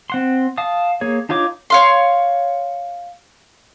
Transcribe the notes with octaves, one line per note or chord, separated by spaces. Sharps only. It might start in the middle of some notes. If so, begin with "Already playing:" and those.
C4 F#5 C6
F5 A5 D#6
A#3 G#4 C#5
D4 D#4 F4 C#5 D6
C#5 F5 C6